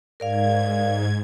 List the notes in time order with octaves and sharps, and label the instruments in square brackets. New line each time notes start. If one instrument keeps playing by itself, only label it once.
[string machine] G#2 G#6 [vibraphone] A#4 D5 F5